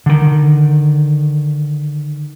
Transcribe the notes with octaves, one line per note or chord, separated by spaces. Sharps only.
D3 D#3